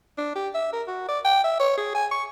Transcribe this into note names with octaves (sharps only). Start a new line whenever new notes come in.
D4
G4
E5
A#4
F#4
D5
G5
E5
C#5
G#4
G#5
C#6